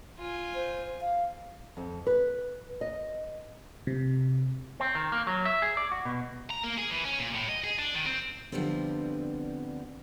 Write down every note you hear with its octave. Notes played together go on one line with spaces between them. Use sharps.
F4 G#5
C5
F5
F2
B4
D#5
C3
C4
D#3
A#3
F#3
E5
G#4
D5
F#4
B2
A#5
A#3
G#4
E3
C#4
A#2
A2
D#5
G#4
D4
D#3
C4
D3 F3 G3 B3 C4